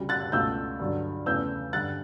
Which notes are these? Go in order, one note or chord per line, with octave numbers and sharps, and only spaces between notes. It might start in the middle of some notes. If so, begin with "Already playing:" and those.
Already playing: D2 C#3 G3
F#6 A6
C#2 B2 A3 E6 G6
G2 D3 F#3
E2 C#3 E3 A3 E6 G6
G2 D3 G3 F#6 A6